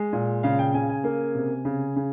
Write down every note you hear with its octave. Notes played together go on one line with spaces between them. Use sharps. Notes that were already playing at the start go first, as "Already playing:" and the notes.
Already playing: G#3
A#2
C#3 F5
G5
C#3 G#5
G#5
A#3
C3
C#3
C#3